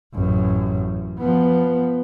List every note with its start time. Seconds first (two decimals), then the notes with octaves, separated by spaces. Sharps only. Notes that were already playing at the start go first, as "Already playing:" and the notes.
0.15 A1 F#2
1.19 F3 B3